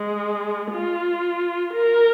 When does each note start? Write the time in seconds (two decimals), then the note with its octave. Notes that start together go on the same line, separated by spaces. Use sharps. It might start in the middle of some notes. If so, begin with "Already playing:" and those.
Already playing: G#3
0.72 F4
1.74 A#4